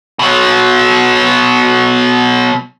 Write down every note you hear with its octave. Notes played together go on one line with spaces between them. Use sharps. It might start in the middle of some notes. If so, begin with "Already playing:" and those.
B2 F#3